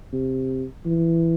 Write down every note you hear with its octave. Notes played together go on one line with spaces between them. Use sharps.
C3
E3